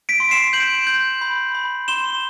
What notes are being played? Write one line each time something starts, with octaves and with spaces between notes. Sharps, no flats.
B6 D7
C6
C7 E7
G6 D7 F#7
G6
B5
B5
C6 E7 G7